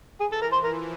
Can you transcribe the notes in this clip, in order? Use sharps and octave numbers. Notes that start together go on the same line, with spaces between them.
E3 G#4
A4
A#4
C5
F3 A#4